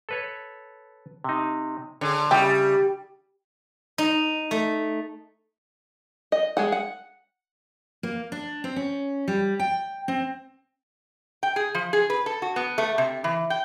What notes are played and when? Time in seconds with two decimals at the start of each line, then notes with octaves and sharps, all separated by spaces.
0.09 A4 B4 C#5
1.24 C3 D#4
2.01 D3 G#4 C#5
2.31 C#3 G3 E4 G4
3.98 D#4
4.51 A3
6.32 D#5
6.57 G#3 G#4 F#5
6.72 F#5
8.03 A#3
8.32 D4
8.64 C4
8.76 C#4
9.28 G3
9.60 G5
10.08 C4
11.43 G5
11.56 G#4
11.75 F3
11.93 G#4
12.10 B4
12.26 A4
12.42 F#4
12.56 B3
12.78 A3
12.98 C3
13.24 E3
13.50 G5